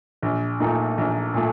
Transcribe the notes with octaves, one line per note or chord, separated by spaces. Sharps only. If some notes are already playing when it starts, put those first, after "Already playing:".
A#1
A#2 A3 D#4
A#1
A#2 A3